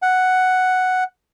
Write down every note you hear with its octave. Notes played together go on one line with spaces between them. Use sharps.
F#5